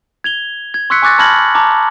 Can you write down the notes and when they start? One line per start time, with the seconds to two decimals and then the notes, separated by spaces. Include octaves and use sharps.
0.24 G#6 F7 G7
0.74 G#6
0.90 C6 C#6 E6 F#6 B6 C#7
1.02 G#5 C#6 D6 F#6 A6 A#6
1.19 A5 B5 F6 G#6 A#6 F#7
1.55 A5 A#5 D6